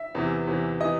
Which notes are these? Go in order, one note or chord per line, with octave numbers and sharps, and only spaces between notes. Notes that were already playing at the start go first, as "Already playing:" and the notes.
Already playing: E5
E2 C3 E3
E2 C3 E3
C3 E3 D#5